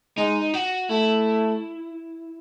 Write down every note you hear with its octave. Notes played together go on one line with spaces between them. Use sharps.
G#3 D#4
F#4
A3 E4